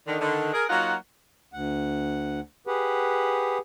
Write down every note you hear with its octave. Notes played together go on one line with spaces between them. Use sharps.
D3 D#3
D3 D#3
G#4 A#4
F#3 A#3 D#4 F4 F#4 F#5
D2 F#5
G4 G#4 B4 F#5